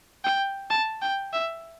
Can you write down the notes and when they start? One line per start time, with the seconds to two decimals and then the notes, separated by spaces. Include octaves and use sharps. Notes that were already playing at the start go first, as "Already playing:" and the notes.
0.24 G5
0.70 A5
1.02 G5
1.33 E5